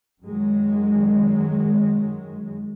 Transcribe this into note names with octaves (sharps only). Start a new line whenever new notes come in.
F#2 D#3 F#3 G#3